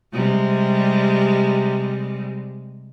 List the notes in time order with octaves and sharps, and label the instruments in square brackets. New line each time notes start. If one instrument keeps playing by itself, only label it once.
[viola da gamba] C3 G3 G#3